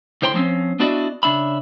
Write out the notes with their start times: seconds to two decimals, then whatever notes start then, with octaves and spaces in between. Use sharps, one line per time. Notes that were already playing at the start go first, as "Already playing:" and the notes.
0.22 D2 A2 C5 G5 A#5 C6
0.34 F3 A#3 C4 C#4
0.80 B3 D4 E4 F#4 D5 D#5
1.23 C#3 D4 E5 B5